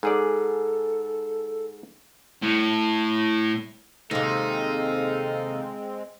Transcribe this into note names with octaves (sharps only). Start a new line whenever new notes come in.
G#2 G#4 A4 D5
A2
D#2 C3 G#3 C4 D#4 A4 F5